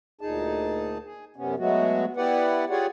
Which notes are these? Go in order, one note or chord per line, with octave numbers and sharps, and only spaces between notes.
D2 A#2 D#4 G#4 A5
G#4
F#2 C3 B3 C#4
F#3 G#3 A3 B3 F#4
B3 E4 G4 B4 D5 F#5
F4 G4 G#4 C#5 D5 F#5